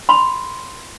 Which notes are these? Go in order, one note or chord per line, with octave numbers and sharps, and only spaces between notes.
B5 C6